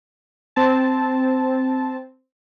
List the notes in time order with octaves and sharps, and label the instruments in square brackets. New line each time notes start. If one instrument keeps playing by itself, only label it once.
[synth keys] C4 A5